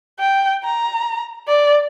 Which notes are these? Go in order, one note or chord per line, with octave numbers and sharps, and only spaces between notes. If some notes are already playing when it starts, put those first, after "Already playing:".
G5
A#5
D5